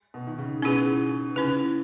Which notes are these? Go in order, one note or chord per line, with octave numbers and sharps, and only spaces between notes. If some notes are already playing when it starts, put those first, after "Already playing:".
B2
D#3
C#3
B2 C#4 E4 G#4 B4
C#3 C#4 E4 B4